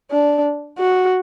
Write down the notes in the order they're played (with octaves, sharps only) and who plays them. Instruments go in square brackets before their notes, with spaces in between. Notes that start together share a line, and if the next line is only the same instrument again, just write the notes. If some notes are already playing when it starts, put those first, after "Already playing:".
[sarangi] D4
F#4